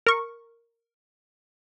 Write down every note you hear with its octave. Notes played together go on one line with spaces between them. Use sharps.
A#4 C#6